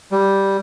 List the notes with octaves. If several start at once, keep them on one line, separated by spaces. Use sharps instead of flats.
G3